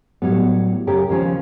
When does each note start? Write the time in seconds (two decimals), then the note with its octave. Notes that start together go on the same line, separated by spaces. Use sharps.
0.22 A2 F#3 G3 B3
0.87 F#2 C#3 C#4 G4 A#4
1.09 D#2 C#3 F3 C#4